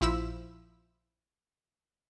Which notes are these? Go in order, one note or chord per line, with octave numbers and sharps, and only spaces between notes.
A#1 F3 E4 E5 E6